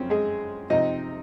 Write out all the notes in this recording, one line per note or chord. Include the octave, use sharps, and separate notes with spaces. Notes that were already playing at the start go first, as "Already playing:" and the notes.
Already playing: F#2 C#3 F3 C4 C#4
G#3 G#4
C3 F3 C4 D#4 D#5